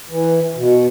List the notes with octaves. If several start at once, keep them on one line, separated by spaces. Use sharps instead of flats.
E3
B2